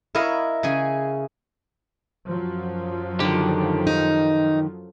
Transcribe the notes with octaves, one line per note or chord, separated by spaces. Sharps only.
E4 A#4 C#5 D#5 F5
C#3 G#4 G#5
F#2 F3 F#3
D3 D#3 G4
D#4